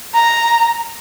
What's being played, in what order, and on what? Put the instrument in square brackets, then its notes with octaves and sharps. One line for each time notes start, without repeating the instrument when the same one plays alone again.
[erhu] A#5